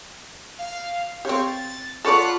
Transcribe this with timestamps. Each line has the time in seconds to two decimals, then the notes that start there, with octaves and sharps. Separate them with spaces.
0.59 F5
1.25 C4 G4 C#5 F5
1.47 A6
2.05 F4 A4 B4 C#5 D5 F#5 A5 B5